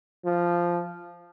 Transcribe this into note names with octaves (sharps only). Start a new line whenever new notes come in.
F3